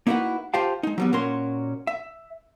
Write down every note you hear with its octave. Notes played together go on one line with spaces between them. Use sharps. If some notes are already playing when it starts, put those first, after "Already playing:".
A#3 D#4 E4 F#4 B4 F#5
F4 G4 C5 F5 G5 A5
G#3 D#4
F#3 G3 B3
A#2 C#4 F#4 A#4 C6
E5